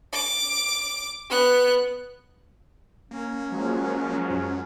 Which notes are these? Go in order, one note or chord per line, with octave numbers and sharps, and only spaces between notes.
D6
B3 F#6
A#3 C#4
F3 F#3 G#3
F#2